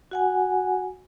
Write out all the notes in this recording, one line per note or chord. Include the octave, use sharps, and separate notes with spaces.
F#4 F#5 G#5